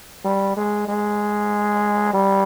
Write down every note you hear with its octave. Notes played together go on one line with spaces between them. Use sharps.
G3
G#3
G#3
G3